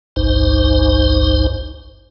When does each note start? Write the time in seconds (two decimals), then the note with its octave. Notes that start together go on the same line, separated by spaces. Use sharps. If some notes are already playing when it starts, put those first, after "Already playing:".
0.16 G#1 C#2 G2 D#4 C5